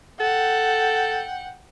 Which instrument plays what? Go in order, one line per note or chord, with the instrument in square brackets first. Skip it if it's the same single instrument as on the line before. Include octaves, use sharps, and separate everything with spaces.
[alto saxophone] A4 [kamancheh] F#5 G5